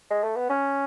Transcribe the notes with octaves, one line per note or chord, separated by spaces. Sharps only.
G#3
A3
B3
C#4